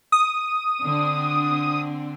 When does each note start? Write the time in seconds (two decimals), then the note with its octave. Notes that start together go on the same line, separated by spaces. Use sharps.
0.12 D#6
0.80 D3 C4 D4